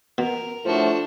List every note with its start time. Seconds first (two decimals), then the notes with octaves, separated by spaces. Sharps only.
0.18 B2 A#4
0.65 A2 F3 A3 D4 F#4